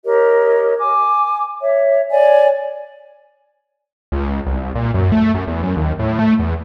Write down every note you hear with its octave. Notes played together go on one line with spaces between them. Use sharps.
G4 A#4 C#5 D#5
G#5 D6
C#5 E5
C#5 D5 G#5
C#2
C2
A#2
F#2
A3
F#2
E2
F#2
D#2
A2
A3
E2